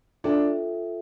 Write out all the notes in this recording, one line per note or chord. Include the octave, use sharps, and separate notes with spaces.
D4 F4 A4 E5 G5